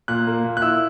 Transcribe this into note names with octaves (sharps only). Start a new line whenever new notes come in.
A#2 F#6
A#3
A#2
F#6
E4 E6